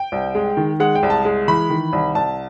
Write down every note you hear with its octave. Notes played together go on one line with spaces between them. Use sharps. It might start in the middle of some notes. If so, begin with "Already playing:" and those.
Already playing: G5
C2
G#3
D#3
G#3 F#5
G5
C2
A5
G#3
E3 B5
D#3
C2
C2 A5